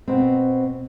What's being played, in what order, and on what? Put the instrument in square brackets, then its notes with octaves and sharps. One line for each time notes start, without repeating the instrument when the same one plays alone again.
[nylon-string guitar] B2 C4